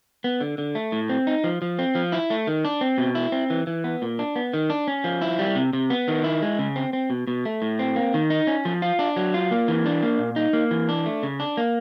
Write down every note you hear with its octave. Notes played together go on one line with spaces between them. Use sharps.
B3
D3
D3
A3
A2
C4
D#4
F3
F3
C4
F3
E4
A3
D#3
D4
C4
B2
E4
C4
E3
E3
B3
A#2
D4
B3
D#3
D4
C#4
F3
E4
G3
C3
C3
B3
D#3
E4
G#3
C#3
C4
C4
B2
B2
A3
A2
C4
A#3
D#3
D#4
C#4
F3
F4
D4
F#3
F4
A#3
E3
D4
A#3
A#2
D#4
A#3
E3
D4
A3
C#3
D4
A#3